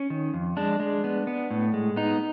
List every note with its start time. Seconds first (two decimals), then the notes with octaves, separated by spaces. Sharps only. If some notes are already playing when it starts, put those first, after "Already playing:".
Already playing: C#4
0.10 D#3
0.34 F2
0.57 G#3 D4
0.80 G#3
1.04 B3
1.27 B3
1.51 A2
1.74 G#3
1.96 B3 D#4